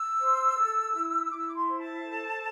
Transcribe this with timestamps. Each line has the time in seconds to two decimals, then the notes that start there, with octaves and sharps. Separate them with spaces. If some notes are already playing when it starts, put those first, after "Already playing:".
Already playing: E6
0.20 C5
0.57 A4
0.94 E4
1.31 E4 D6
1.39 E6
1.47 D6
1.55 C6
1.68 C5
1.81 A5
2.05 A4